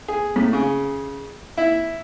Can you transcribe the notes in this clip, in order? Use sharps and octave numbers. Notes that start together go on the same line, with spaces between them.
G#4
A2
C#3
E4